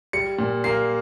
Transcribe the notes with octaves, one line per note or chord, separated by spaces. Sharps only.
G3 C#7
A#2
A#3 C7